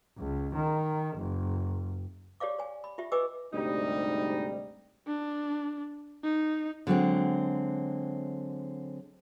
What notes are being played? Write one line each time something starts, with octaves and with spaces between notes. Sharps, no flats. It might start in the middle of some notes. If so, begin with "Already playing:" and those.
C#2
D#3
F#1
G4 C#5 D5 F5 D6
C#5 G#5
B5
F4 G4 E5
G4 B4 D#5 G#5 D6 E6
D2 G#2 C3 G3 D#4
D4
D#4
D3 F#3 G#3 C4